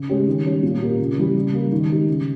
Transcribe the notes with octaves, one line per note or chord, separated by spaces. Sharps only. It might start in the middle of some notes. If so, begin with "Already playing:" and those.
Already playing: C#3
G#3 C#4 G4
D#3
G3 C#4
A#2
A#3 C#4 G4
C#3
E3 G3
C#3
G3 A#3
D#3
G#3 D#4 G4
C#3